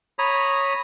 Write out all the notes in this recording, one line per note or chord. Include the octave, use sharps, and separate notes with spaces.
C#5 A#5 B5 D#6